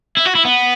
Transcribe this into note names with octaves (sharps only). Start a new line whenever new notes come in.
E4
F#4
E4
B3